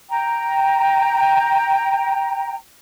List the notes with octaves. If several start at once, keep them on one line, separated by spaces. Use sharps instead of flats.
G5 A#5